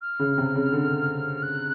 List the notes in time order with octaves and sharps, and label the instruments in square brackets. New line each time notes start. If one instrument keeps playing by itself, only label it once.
[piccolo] F6
[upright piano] C#3
C3
C#3
D3
[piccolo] F#6